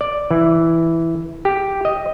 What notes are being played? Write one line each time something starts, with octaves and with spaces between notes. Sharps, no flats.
D5
E3
G4
D#5